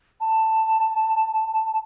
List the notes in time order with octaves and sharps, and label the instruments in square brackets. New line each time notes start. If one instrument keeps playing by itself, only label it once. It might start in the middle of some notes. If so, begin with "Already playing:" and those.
[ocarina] A5